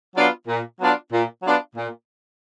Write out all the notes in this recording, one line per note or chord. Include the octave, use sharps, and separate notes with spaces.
F#3 B3 D4 F4
A#2
F#3 B3 D4 F4
A#2
F#3 B3 D4 F4
A#2